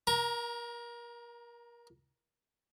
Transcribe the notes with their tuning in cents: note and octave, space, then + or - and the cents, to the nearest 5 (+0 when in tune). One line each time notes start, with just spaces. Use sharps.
A#4 +30 A#5 +0